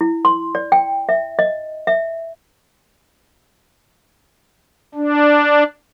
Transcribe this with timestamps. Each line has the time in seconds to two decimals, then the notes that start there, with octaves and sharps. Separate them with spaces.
0.01 E4
0.25 C6
0.55 D5
0.72 G5
1.09 E5
1.39 D#5
1.87 E5
4.95 D4